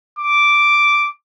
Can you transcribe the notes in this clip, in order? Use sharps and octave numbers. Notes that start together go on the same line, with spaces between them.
D6